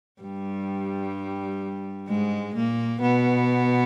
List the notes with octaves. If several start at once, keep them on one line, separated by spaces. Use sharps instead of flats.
G2 G3
G#2 G#3
A#2 A#3
B2 B3